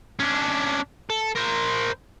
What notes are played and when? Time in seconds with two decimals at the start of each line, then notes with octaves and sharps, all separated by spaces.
0.20 C#4 D4
1.10 A4
1.35 A#4 C5